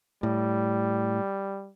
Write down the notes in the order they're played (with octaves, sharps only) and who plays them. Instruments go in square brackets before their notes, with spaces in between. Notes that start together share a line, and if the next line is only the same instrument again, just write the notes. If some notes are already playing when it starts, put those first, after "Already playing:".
[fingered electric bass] A2 [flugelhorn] G3